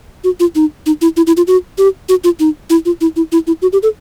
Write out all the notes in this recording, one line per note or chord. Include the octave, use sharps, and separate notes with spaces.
F#4
F4
D#4
D#4
E4
E4
E4
F4
F#4
G4
F#4
F4
D#4
E4
F4
E4
E4
E4
E4
F#4
G4
A4